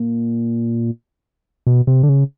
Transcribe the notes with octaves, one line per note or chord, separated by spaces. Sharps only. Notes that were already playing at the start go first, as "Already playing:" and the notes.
Already playing: A#2
B2
C3
D3
C#3